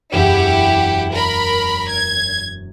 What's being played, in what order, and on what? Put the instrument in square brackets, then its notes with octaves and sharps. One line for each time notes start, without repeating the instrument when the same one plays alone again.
[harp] E1 F#2 D7 [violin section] E4 G4 F#5
[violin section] A#4 B5
G#6